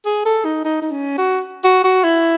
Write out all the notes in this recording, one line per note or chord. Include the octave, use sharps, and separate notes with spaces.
G#4
A4
D#4
D#4
D#4
C#4
F#4
F#4
F#4
E4